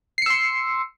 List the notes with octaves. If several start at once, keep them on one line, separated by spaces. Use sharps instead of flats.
C6 E6 C7 C#7